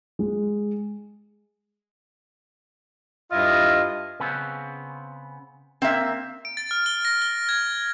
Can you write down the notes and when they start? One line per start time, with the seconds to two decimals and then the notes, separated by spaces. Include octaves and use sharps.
0.19 G#3
3.32 G2 E4 F4 D#5
4.20 C#3 B3 C4
5.82 A#3 C4 E5
6.45 D7
6.57 A6
6.71 F6
6.86 G7
7.05 A#6
7.22 G7
7.49 G#6